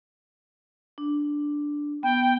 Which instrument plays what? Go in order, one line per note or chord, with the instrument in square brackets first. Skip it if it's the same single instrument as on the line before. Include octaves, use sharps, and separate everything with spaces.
[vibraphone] D4
[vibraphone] B3 [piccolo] G5